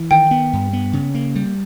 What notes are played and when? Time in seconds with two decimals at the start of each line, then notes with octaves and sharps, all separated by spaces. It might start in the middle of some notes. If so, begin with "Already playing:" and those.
Already playing: E3
0.11 D#3 G5
0.31 B3
0.53 G2
0.73 B3
0.93 C#3
1.15 A#3
1.35 G3